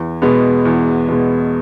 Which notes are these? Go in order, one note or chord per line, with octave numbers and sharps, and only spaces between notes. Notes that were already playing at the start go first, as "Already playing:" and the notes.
Already playing: E2
B2 G#3 B3
E2
B2 G#3 B3